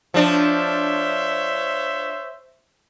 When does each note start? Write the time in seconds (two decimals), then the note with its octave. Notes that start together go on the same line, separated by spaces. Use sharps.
0.14 F3 D4 C5 C#5 E5